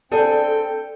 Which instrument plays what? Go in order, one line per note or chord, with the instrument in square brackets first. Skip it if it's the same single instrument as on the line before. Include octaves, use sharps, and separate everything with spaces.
[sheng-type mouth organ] C4 G5 G6 [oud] D4 G#4 [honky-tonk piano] A4